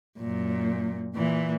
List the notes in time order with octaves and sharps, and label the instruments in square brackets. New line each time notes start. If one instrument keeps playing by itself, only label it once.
[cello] F#2 A#2
A#2 E3